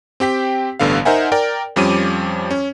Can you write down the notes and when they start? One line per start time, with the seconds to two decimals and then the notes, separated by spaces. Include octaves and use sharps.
0.20 C4 G4 G5 B6
0.79 A1 G2 D3 B3 F5
1.05 D#4 A#4 C5 E5 F#5 G#5
1.32 A#4 D5 G5
1.76 F2 F3 G3 C#4 D6 D#7
2.51 C#4